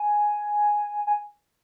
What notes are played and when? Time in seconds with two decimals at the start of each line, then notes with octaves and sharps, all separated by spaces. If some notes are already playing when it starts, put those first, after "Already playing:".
Already playing: G#5
1.07 G#5